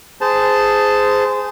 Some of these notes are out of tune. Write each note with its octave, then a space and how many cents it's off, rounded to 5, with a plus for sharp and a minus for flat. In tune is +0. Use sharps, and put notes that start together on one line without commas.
G#4 +0 C5 -20 A5 +0